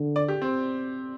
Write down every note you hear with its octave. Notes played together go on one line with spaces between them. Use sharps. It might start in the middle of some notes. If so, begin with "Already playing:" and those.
Already playing: D3
D5
G4
C4